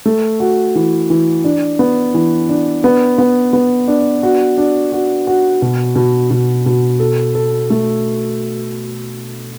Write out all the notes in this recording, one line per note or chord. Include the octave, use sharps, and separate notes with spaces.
A3
F#4
E3
E3
D4
B3
E3
D4
B3
B3
B3
D4
F#4
D4
F#4
F#4
B2
B2
B2
B2
A4
A4
A3